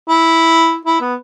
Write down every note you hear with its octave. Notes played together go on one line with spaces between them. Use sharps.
E4
E4
B3